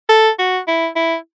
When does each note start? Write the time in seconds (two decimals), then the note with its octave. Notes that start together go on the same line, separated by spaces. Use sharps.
0.09 A4
0.39 F#4
0.68 E4
0.96 E4